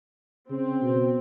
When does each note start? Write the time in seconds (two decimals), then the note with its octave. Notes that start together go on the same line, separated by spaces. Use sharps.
0.49 C#3 C4
0.81 B2